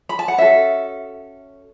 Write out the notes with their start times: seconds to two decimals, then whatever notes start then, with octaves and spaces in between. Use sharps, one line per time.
0.09 B5
0.19 A5
0.28 F#5
0.38 C#4 F#4 A4 E5